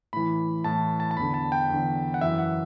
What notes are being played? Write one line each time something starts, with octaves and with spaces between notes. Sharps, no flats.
A2 E3 B5
A2 E3 A5
A5
A5
E2 D3 B5
A5
G5
E2 D3
F#5
F#2 E3 E5
F#5